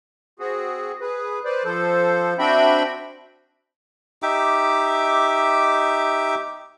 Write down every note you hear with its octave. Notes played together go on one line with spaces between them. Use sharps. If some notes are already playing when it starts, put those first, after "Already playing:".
C4 F#4 G#4
G#4 B4
B4 C5 D5
F3 A4 C5
C4 D4 F#4 E5 G5 B5
D#4 G4 E5 D6